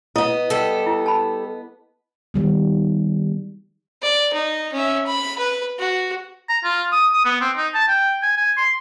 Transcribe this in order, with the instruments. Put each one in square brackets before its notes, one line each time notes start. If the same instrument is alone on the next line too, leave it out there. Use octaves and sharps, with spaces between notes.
[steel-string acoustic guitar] B3 D#5 [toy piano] E4
[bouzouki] G3 A4
[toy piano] E4
A5 B5
[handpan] D#3 G3 B3
[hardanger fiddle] D5
D#4
C#4 E5
B5
B4
F#4
[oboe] A#5
F4
D#6
D#6
B3
C4
D#4
A5
G5
G#5
G#5
C6